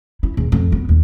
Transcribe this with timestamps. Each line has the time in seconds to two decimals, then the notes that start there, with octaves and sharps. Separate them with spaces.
0.23 E4
0.37 E2
0.52 F2
0.72 B3
0.89 D#2